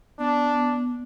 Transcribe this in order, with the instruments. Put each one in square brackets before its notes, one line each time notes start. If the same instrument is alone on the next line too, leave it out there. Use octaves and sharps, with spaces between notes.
[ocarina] B3 [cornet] D4